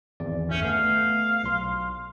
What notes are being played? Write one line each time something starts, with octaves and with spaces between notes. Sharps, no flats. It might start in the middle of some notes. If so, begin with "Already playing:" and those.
G#1 E2 D5
G1 C#4 E5 G6
A3 B3 F5
B1 C6